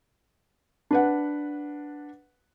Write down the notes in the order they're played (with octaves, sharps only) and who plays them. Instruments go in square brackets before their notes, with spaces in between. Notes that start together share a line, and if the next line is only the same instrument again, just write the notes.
[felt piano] D4 B4 F#5